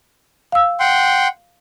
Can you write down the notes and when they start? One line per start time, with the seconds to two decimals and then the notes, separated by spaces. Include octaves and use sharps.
0.52 F5 E6
0.80 F#5 G5 C6